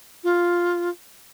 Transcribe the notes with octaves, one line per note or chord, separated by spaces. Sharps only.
F4